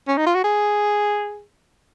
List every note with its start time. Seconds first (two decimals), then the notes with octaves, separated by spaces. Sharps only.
0.08 C#4
0.17 D#4
0.26 F4
0.35 F#4
0.44 G#4